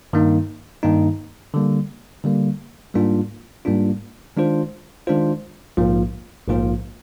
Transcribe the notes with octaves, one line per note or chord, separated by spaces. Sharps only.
G2 D#3 A#3 D#4
G2 D#3 A#3 D#4
D3 G3 A#3
D3 G3 A#3
G#2 G3 A#3 D4 F4
G#2 G3 A#3 D4 F4
D#3 G#3 D4 F4 C5
D#3 G#3 D4 F4 C5
A#1 G#2 F3 A#3 F4
A#1 G#2 F3 A#3 F4